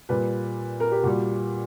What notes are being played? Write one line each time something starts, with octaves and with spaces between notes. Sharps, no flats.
A#2 G3 B4
A#4
G4
A#2 G3 F#4